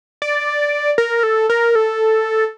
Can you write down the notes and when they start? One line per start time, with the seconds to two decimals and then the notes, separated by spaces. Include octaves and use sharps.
0.22 D5
0.98 A#4
1.23 A4
1.50 A#4
1.75 A4